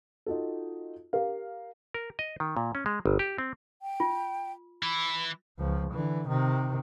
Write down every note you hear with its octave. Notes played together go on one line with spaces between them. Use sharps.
D#4 F4 F#4 A4
G4 A#4 F5
A#4
D#5
D#3
A#2
C#4
G#3
G1
G4
C4
G5
F4
E3 E4 B5
C#2 F3
D3 E3
C3 D#3